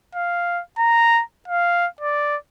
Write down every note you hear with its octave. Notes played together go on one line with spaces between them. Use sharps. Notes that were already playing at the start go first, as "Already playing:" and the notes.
F5
A#5
F5
D5